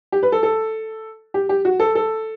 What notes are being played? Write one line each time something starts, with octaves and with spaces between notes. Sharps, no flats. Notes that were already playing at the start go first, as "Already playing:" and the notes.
G4
B4
A4
A4
G4
G4
F#4
A4
A4